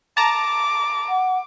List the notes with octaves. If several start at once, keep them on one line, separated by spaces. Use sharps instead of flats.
A5 A#5 D6
F#5